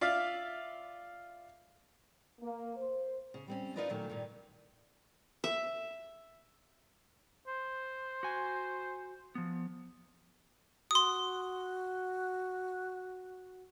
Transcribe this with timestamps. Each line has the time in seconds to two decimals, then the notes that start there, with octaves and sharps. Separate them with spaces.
0.01 F4 D5 E5 F5
2.40 A#3
2.76 C5
3.34 C#3
3.48 G3 C4 C#4
3.76 D#4 F4 A#4 B4 D5 D#5
3.89 A#2 D#3 F#3 A3
4.10 G2 A#2 D#3
5.44 E5
7.47 C5
8.23 F#4 G#5
9.35 F3 B3
10.91 F#4 C6 D#6